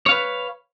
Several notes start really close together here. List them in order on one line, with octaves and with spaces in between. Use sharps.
C#5 F5 B4